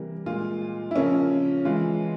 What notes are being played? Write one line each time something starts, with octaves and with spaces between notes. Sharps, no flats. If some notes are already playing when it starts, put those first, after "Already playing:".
Already playing: C3 E3 G3 A#3
A#2 G#3 F4
E4
C#3 F3 A#3 C#4
E3 G#3 F4